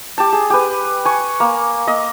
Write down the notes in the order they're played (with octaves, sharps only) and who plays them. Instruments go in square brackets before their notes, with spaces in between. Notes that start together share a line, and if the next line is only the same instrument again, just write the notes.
[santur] G4 A5
G#4
G4 B4
G#5 C#6
A#3
A#3 D#5